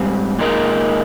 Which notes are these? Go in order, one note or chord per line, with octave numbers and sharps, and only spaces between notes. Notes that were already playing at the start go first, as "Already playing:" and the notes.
Already playing: G#2 G3 C4
A#2 G#3 D#4 A#4